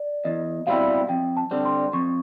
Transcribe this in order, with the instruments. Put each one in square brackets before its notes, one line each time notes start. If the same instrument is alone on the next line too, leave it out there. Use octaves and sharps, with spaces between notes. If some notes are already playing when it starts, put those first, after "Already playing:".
Already playing: [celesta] D5
[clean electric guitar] E2 [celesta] D#5
[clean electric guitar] B2 G3 C4 E4 [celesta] F5
[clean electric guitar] F2 [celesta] G5
[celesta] A5
[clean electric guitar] D3 G3 C4
[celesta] C6
[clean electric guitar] F2 [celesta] C#6